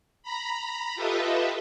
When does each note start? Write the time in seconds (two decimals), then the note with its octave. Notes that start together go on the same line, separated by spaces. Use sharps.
0.23 A#5 B5
0.95 F4 G4 A4 B4 D#5 E5